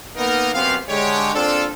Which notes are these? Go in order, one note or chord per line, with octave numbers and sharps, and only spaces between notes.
A#3 B3 D#4 A#4
F#2 B3 C4 G4 F5
D3 G#3 G4 C#5
A#2 C4 D4 F4 A4